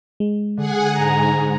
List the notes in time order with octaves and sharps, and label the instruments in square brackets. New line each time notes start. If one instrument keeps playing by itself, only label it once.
[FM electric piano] G#3
[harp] D3 [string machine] G#4 F#5 G#5
[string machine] G#2 [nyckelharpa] A#5